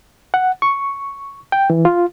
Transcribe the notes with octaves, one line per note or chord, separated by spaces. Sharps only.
F#5
C#6
G5
E3
F4